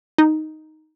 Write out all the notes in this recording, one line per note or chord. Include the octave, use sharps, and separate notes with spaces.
D#4